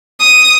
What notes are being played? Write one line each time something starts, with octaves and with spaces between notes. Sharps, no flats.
D#6